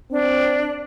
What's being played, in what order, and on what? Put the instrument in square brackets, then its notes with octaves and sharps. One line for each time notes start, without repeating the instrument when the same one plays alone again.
[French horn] C4 [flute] D4